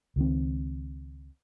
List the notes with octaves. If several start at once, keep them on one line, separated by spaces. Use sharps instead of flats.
C#2 D#3 C4